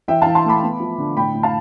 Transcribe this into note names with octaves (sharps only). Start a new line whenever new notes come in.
E3 E5 G5
E3 F5 A5
A5 C6
A3 B5 D6
B3
F3
D3
A2 G5 B5
A2
F5 A5